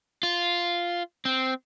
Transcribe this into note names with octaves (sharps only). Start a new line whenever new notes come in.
F4
C4